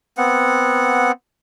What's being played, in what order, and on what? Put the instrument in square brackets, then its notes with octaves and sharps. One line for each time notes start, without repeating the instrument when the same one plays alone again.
[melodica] B3 C4 F#5